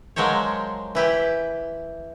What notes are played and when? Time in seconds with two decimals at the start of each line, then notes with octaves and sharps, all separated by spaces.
0.16 F3 F#3 G#3 A#4 C5 C#5
0.95 E3 E4 G4